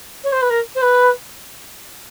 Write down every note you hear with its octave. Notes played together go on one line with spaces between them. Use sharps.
C#5
C5
B4
A#4
C5
B4